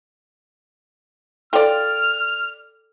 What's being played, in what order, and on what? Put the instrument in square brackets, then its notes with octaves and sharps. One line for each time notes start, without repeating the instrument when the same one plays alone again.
[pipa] F4 D5 [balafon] A4 G5 [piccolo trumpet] F6